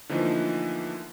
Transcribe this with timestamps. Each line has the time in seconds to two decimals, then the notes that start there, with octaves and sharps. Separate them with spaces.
0.09 D3 E3 F3 A3 A#3 D#4